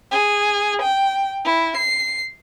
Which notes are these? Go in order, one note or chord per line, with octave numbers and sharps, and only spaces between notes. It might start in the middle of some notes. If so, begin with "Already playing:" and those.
G#4
G5
E4
C7